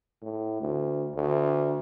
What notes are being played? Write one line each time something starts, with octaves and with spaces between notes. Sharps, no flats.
A2
D2
D2